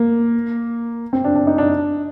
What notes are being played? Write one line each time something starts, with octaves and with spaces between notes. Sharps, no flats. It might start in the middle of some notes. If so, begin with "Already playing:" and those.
Already playing: A#3
C4
D4
D4
D#4
D4